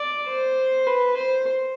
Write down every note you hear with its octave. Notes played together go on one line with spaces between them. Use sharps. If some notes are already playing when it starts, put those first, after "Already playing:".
Already playing: D5
C5
B4
C5